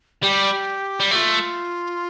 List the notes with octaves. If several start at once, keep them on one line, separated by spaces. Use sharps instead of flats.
G3 G4
G3
A3 F4 G4